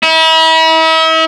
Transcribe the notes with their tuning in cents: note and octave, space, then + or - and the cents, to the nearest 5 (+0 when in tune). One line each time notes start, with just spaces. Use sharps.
E4 -40